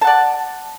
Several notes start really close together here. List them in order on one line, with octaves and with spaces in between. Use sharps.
A5 F#5 D5